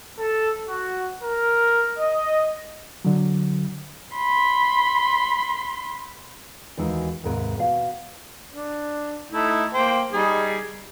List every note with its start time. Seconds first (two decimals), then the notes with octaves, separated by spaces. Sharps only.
0.19 A4
0.68 F#4
1.23 A#4
1.98 D#5
3.05 D3 F#3
4.16 B5 C6
6.77 D#2 E3 G#3 D#4 F#4
7.23 D#2 G#2 C3 A#4 B4
7.58 B2 F5
8.53 D4
9.30 A3 D#4 E4
9.74 A#3 C5 G5
10.13 G3 D#4 G#4